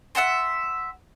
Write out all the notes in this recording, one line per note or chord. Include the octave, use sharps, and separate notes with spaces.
E5 F#5 A5 C6